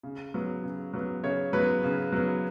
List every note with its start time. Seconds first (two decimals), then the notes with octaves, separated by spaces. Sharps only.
0.03 C#3
0.34 F#3 B3
0.63 C#3
0.94 F#3 B3
1.23 C#3 C#5
1.53 F#3 B3 B4
1.83 C#3
2.13 F#3 B3